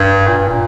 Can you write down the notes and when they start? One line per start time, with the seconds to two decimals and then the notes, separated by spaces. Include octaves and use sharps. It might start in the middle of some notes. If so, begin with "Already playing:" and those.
Already playing: G2
0.28 A#2
0.38 G2
0.48 A#2